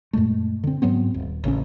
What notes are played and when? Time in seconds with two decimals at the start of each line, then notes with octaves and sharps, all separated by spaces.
0.13 F#2 A#2 G#3 A3
0.64 D3 C4
0.82 G#2 F#3 B3 C4
1.14 D#1
1.44 A1 C#3 A#3 C#4